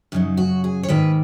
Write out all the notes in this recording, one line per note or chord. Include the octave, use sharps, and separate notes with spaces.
F#2 C#3 F#3 D#4
F#4
G#4
C#5
G#2 D#3 A#3 B4